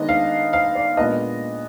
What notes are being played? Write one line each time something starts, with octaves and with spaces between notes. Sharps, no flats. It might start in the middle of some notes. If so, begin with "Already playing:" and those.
Already playing: D#3 G#3 B3 D4 D#5
F5
F5
D5
A#2 G#3 B3 D4 D#5